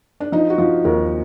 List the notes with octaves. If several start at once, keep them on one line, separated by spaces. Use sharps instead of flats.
D4
F3 D#4
F#4
F3 F4
D#2 A#4